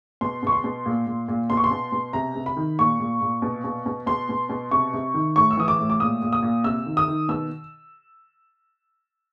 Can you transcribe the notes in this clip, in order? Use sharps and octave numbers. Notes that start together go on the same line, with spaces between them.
B2 C6
B2 C#6
C6
B2
A#2
A#2
A#2
B2 C6
C#6
C6
B2
B2
C3 A#5
C3
B5
D#3
A#2 C#6
A#2
A#2
B2
B2
B2
B2 C6
B2
B2
C3 C#6
C3
D#3
A2 C#6
E6
E3 D#6
D6
A2
D6
A#2 D#6
A#2
D#6
A#2
C3 E6
D#3
D#6
D#3
B2 E6